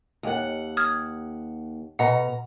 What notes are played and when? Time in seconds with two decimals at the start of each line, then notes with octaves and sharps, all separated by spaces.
0.23 D#2 F#5
0.77 D#6 F6 G#6
1.99 B2 F#5 A#5